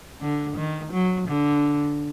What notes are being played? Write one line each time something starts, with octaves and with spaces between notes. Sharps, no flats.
D3
D#3
F#3
D3